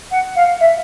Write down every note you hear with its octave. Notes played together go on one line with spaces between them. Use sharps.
F#5
F5
E5